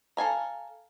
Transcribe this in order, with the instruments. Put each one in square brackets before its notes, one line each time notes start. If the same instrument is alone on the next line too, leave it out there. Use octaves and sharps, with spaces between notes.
[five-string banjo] A4 F5 G#5 A#5